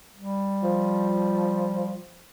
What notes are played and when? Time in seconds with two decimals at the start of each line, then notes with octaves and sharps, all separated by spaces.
0.17 G3
0.63 F3